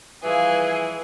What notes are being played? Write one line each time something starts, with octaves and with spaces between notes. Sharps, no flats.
E3 F3 G3 F4 G#4